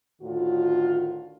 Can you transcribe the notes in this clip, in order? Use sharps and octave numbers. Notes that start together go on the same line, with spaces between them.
D2 A2 D3 D#3 F4 F#4